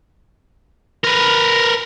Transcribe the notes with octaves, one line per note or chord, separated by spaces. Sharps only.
A#4 B4